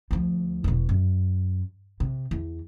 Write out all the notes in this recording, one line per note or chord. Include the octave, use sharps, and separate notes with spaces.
D2 F3
E1 B2
F#2
C3
E2